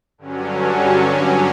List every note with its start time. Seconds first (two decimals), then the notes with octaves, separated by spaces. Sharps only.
0.18 G2 D3 F#3 C#4